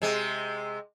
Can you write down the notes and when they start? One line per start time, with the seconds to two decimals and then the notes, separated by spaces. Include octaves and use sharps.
0.02 C3 G#3